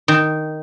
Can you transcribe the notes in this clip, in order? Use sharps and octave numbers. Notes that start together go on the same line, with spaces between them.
D#3